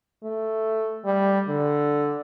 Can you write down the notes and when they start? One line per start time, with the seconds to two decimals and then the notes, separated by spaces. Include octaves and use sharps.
0.24 A3
1.05 G3
1.49 D3